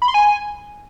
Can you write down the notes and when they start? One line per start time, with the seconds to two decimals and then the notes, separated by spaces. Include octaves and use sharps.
0.02 B5
0.08 C6
0.14 G#5